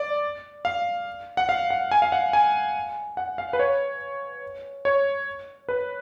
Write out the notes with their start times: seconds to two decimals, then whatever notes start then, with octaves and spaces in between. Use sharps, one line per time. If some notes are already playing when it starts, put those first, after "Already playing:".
Already playing: D5
0.65 F5
1.37 F#5
1.49 F5
1.70 F#5
1.91 G#5
2.02 F5
2.12 F#5
2.33 G#5
3.17 F#5
3.38 F5
3.53 B4
3.59 C#5
4.85 C#5
5.69 B4